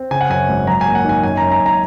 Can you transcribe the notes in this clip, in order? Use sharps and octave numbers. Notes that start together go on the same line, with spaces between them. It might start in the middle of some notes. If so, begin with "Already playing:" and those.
Already playing: C4
C#3 G#5
F#5
F#2 G#5
G#1
F#3 A#5
G#5
A#3
F#5
D#3 G#5
F#2 G#5
F#2 A#5
A#5
F#2
A#5